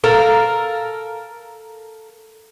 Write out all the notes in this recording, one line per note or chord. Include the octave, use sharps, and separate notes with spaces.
A4 A#4 F5